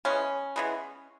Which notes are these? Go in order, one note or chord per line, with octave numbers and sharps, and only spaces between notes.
E3 G#3 B3 C#4
E3 G#3 B3